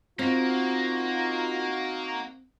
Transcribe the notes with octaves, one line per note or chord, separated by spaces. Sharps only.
A#3 C4 D#4 F4 F#4